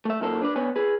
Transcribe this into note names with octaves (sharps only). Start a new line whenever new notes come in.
A3 E5
F#2 A#2 D#3 A4 C5
D4 B4 D5
B3 B4 C#5 G#5
G#4 B4